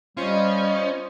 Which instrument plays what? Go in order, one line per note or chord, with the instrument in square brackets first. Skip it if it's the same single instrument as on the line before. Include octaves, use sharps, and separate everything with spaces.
[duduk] G3 [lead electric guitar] C#4 [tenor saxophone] F4 [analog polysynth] C5 D#5